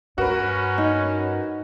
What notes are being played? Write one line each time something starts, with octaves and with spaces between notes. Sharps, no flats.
G2 C#4 F#4 A#4 B4
D#4